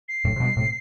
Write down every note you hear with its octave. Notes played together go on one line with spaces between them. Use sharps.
C7
F#2 A2
C3
G2 B2
A2 C3